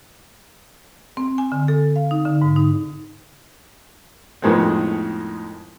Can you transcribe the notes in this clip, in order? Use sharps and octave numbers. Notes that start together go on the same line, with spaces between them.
C4
G#5
D3
A4
F5
D#4
D3
G#2
D#4
F2 A2 D#3 G#3 B3 C4